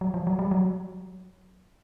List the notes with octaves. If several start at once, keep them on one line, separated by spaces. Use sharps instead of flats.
F#3
F3
F#3
G3
F#3